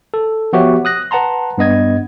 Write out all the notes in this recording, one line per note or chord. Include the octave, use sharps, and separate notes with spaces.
A4
F3 B3 F#4 G4 C#5 E5
D#6 F#6 A#6
B4 F#5 A5 A#5 C6
G2 B3 D#5 G#6